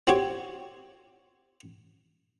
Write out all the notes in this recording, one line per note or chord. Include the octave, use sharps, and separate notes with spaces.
C4 F#4 G4 C#5